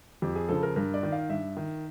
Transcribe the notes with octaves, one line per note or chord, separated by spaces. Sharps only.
F2 G4
G#4
C#3 F3 A4
A#4
G2 A#4
D5
D#3
F5
G2 E5
D#3